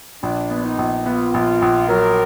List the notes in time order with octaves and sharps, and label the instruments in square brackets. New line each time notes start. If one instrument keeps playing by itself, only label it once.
[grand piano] A#1 [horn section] D4
[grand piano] B3
[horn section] D#4
[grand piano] A#1
[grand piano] B3 [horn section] F4
[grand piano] A#1
A#1
[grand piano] F#3 [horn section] A#4